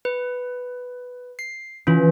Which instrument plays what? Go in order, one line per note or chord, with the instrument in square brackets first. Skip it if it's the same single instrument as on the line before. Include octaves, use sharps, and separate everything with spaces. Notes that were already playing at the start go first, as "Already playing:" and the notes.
[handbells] B4
C7
[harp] E3 [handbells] C#4 F4